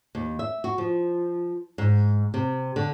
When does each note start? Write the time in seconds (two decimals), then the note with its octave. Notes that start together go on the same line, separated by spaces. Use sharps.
0.15 D#2
0.39 E5
0.64 F#4
0.78 F3
1.78 G#2
2.34 C3
2.76 D3